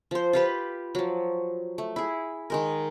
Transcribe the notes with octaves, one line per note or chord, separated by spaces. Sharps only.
F3 C5
F4 G4 B4
F3 F#3
A3
E4 G#4
D#3 G#3 A#4